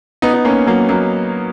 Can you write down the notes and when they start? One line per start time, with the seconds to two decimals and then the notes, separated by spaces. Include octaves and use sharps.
0.22 B3 D#4
0.34 D#4
0.45 A#3 C#4
0.66 F#3 A#3
0.89 F#3 A#3